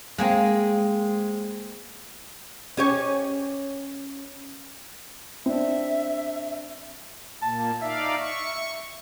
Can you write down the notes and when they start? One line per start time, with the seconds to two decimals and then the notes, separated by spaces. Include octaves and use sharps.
0.18 G#3 A#3 C4
2.77 C#4 G4 C#5
5.46 C4 D4 E5
7.42 A#2 A#3 A5
7.82 D#4 D5 E5 F5
8.19 C#6